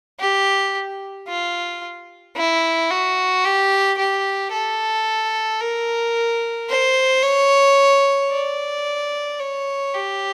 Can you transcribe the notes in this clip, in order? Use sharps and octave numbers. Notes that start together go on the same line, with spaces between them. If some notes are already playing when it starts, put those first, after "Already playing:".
G4
F4
E4
F#4
G4
G4
A4
A#4
C5
C#5
D5
C#5
G4